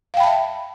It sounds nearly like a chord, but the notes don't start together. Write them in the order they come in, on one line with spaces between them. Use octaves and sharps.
F5 G5 B5 A5 E5